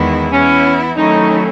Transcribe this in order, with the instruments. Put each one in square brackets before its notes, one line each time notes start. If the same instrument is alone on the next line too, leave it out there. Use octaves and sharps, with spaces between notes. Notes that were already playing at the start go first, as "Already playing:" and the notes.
Already playing: [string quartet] E2 D#3 G#3 B3 E4
[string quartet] E3 B3 E4 [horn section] C#4
[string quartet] D#3 F#3 A3 C#4 E4 [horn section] D#4